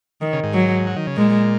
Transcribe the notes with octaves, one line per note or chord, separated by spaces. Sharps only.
D#3
C#3
G#2
F#3
F#3
D#3
C#3
A#2 G#3